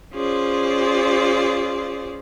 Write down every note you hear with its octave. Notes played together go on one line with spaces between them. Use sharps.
C#4 F4 G#4 C5 D5